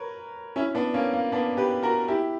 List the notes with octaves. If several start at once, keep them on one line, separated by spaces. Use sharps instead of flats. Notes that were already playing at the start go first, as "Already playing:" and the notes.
Already playing: A#4 B4 C#5
C#4 E4
B3 D4
A#3 C#4
A#3
B3 D4
G4 B4
F#4 A#4
E4 G4